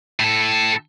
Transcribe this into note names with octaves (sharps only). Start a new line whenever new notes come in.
A2 A4